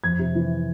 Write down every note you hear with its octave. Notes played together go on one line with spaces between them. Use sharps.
F2 G#6
C3
E3